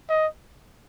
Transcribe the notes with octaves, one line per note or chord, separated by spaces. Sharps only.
D#5